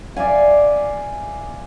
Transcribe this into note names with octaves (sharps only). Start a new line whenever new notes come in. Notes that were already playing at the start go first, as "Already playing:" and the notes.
D5 E5 F5 G#5